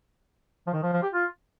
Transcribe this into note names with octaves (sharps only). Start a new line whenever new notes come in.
F3
D#3
F3
F3
G4
F4